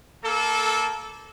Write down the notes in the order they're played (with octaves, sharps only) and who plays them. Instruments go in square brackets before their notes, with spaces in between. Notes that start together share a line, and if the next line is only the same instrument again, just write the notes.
[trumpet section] A#3 A4